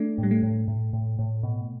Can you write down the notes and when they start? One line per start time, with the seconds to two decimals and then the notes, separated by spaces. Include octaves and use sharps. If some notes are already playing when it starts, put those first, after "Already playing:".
Already playing: A3 D4
0.18 A2 G3
0.31 A3
0.43 A2
0.68 A2
0.93 A2
1.19 A2
1.43 B2